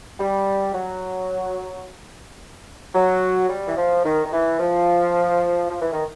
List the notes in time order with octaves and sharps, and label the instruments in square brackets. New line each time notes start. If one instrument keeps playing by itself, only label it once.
[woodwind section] G3
F#3
F#3
G3
E3
F3
D#3
D#3
E3
F3
F3
E3
D#3